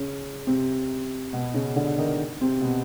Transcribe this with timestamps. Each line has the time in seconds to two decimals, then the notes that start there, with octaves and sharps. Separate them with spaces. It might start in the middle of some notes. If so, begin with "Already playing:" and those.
Already playing: C#3 C#4
0.47 C3 C4
1.33 B2 B3
1.54 C#3 C#4
1.76 D3 D4
1.98 D#3 D#4
2.41 C3 C4
2.61 B2 B3